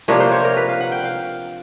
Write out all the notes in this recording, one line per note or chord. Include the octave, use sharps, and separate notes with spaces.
C3 F3 A#3 D4 C#5
C5
C#5
A#4
B4
F5
F#5
G5
F5